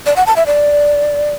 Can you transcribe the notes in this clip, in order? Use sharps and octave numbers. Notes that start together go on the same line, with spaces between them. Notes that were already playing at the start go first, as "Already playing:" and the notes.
D5
F#5
A5
E5
D5